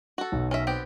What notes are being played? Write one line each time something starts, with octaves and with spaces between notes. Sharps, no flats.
F#4 A4
B1
C#4 A#4 E5
B3 C4 G4